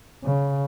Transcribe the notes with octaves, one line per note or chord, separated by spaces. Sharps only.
C#3